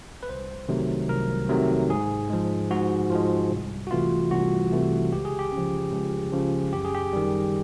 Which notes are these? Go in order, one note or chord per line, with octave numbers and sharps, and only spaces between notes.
B4
C2 C5
C3 D#3 F#3 A3
C2 A#4
C3 D#3 F#3 A3
G#2 G#4
F3 G#3
G#2 F#4
F3 G#3 F4
C2
F#4
C3 E3 A3 F4
C2 F#4
C3 E3 A3
C#2 G4
G#4
G4
C#3 F3
C#2
C#3 F3
F#2 G4
G#4
G4
D#3 G3